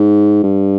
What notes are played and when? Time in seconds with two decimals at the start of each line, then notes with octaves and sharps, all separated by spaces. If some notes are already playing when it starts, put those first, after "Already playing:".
Already playing: G#2
0.43 G2